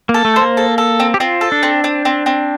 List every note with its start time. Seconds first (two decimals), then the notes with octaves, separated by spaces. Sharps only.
0.09 A#3
0.14 A4
0.25 A3
0.36 C5
0.41 A#3
0.57 A4
0.78 A4
1.00 C4
1.14 G4
1.20 C4 F4
1.41 A4
1.52 D4
1.63 C4
1.84 C4
2.05 C4
2.26 C4